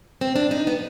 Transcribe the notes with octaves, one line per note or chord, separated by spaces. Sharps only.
C4
D4
D#4
B3